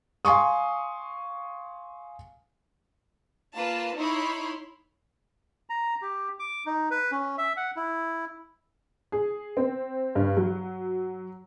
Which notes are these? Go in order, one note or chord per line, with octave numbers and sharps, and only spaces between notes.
F5 G#5 C6 C#6 D#6
A#3 F4 B4 A5
D#4 E4 C#5 B5 C6
A#5
G4
D6
D#4
B4
C#4
E5
F#5
E4
G#4
C4
G2
F#3